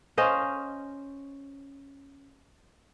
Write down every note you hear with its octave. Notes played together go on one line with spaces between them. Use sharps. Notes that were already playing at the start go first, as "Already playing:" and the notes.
C#4 C5 D#5 F5